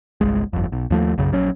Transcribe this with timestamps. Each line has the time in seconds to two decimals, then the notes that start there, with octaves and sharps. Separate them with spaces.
0.21 G1 C2 G#3
0.53 G1 F2
0.72 B1
0.90 D#2 F3 A3
1.18 B1 F#2 C#3
1.32 A#1 F#3 C#4